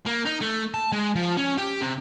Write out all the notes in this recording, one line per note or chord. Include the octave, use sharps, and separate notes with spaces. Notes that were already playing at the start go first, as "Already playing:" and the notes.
A#3
D#4
A3
A5
G#3
F3
C#4
G4
C3